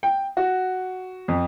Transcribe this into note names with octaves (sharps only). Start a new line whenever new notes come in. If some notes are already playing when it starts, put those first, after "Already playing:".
G5
F#4
F2